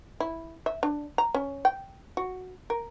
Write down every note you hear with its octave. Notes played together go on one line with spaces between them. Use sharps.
E4
E5
D4
A#5
C#4
G5
F#4
A#4